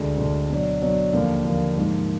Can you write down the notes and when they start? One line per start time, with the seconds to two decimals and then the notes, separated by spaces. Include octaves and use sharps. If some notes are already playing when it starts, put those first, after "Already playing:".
Already playing: D2 D3 G#3
0.17 D2 D3 G#3
0.49 B2 F#3 D4
0.81 B2 F#3 D4
1.13 D#2 D3 F3 A#3
1.45 D#2 D3 F3 A#3
1.77 G#2 F3 A#3 D#4